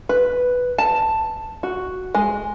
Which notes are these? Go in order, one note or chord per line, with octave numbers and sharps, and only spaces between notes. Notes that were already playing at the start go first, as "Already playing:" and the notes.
B4
A5
F#4
G#3